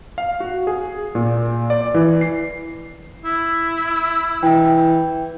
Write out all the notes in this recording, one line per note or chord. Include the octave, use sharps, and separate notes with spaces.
F5
F#4
G#4
A#2
D5
E3
C7
E4
E3 G5